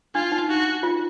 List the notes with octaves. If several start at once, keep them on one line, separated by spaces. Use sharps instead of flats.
D4 F4
D#4
F#4
F4